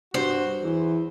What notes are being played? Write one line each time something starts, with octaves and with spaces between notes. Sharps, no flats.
G2 F#4 C5
E2 E3